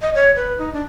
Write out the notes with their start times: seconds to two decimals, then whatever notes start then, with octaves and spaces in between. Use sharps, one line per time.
0.02 D#5
0.15 C#5
0.36 B4
0.58 D#4
0.73 D4